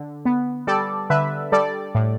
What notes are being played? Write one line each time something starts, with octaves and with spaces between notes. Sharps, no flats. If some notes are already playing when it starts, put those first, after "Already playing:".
Already playing: D3
B3
G3 A4 D5
D3 B4 E5
G3 A4 D5
A2